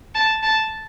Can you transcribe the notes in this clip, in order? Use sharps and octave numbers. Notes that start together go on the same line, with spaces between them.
A5
A5